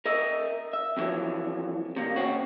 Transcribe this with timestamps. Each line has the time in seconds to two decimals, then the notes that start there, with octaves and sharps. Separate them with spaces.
0.06 A#4 D#5 E5
0.73 E5
0.97 F2 A#2 D#3 E3 F#3
1.97 C3 A#3
2.16 C4 C#4 F#4